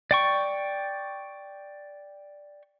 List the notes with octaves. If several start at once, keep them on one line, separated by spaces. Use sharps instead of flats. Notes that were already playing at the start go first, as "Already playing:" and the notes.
D5 G5 C#6